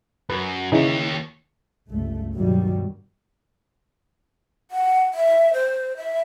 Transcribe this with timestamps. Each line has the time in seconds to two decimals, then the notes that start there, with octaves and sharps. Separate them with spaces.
0.30 F#2 B4
0.72 D#2 C#3 E3 D#4 C#5
1.90 G1 C#2 A3
2.36 G2 B2 D#3 F#3 G3
4.71 F#5
5.14 E5
5.53 C5
5.97 E5